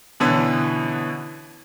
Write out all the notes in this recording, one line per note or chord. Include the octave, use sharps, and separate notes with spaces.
B2 D3 E3 C#4